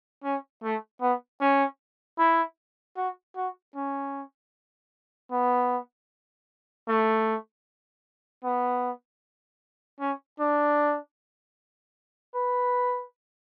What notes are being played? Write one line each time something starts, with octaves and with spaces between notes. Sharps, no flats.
C#4
A3
B3
C#4
E4
F#4
F#4
C#4
B3
A3
B3
C#4
D4
B4